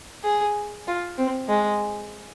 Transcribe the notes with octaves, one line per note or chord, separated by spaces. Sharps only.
G#4
F4
C4
G#3